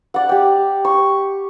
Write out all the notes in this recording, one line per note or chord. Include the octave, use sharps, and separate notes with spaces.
D5 F#5
G4 G5
C#6